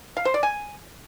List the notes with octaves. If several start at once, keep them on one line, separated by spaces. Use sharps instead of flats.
F5
C5
D5
G#5